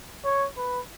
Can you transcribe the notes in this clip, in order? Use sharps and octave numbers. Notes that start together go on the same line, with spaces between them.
C#5
B4